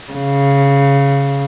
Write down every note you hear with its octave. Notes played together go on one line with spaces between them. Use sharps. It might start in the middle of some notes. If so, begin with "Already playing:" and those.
C#3